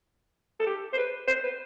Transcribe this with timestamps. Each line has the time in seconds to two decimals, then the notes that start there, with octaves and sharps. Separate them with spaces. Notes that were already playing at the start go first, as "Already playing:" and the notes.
0.60 A4
0.66 G4
0.93 C5
0.97 B4
1.28 C5
1.43 B4